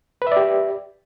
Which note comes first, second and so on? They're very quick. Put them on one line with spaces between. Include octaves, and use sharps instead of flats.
B4 E5 D5 G4